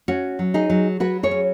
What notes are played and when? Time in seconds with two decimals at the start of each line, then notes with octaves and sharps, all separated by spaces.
0.08 C#4 F#4
0.39 F#3
0.54 D#4 G#4
0.70 F#3
1.00 F#3 F#4 B4
1.23 G#4 C#5
1.31 C#4